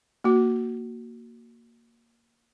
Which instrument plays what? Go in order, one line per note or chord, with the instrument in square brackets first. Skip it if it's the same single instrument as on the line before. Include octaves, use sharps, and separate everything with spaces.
[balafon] A#3 F#4